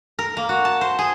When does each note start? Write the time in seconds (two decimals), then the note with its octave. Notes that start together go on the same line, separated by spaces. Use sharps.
0.19 A#4
0.37 A#3
0.49 F#4
0.65 A5
0.81 C5
0.99 G#4